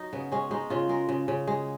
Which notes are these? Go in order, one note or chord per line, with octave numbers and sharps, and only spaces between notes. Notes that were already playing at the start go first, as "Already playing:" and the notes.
Already playing: F#3 D#4
C#3 B3
G#3 C#4
G#3 D#4
C#3 F4
G#3 A#4
C#3
C#3
G#3